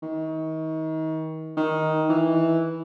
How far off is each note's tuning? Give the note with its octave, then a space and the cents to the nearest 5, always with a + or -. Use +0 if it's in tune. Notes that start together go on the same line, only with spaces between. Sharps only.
D#3 +35
D#3 +10
E3 -5